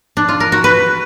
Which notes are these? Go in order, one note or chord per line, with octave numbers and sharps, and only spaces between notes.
D4
F4
A#4
F#4
B4